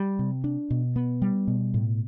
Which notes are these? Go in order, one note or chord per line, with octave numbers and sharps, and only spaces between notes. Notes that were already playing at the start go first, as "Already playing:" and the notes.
Already playing: G3
C3
D4
B2
B3
G3
B2
A2